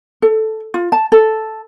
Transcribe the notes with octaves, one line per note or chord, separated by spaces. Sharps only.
A4
F4
A5
A4